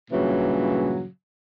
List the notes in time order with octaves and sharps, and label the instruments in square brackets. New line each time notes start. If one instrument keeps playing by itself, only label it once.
[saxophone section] G2 A#2 C#3 E3 F#3